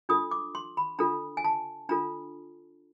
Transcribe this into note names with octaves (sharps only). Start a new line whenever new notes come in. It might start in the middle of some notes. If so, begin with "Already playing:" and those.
D4 F4 A4 D#6
D6
C6
B5
D4 F4 A4 A#5
G#5
A5
D4 F4 A4 A#5